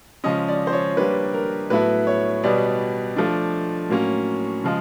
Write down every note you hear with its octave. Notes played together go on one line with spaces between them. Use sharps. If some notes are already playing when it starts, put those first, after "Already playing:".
C#3 F3 G#3 C#4 D#5
D5
C5
C#5
G3 A#3 D4 B4
A#4
A2 F#3 B3 E4 A4 B4
C#5
B2 G3 B3 D5
F3 A3 D4
A2 F#3 A#3 C#4
C#3 F3 G#3